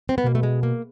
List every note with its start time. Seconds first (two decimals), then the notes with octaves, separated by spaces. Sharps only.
0.09 C4
0.18 B3
0.24 B2 A#3
0.35 A3
0.43 G#3
0.63 A#3